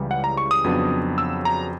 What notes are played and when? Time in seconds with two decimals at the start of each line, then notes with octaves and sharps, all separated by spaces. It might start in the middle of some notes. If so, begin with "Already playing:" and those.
Already playing: C#2 C#3 E3 G3
0.11 F#5
0.24 A#5
0.37 C#6
0.51 D#6
0.64 F2 C#3 F#3 B3 D4
1.18 E6
1.45 A#5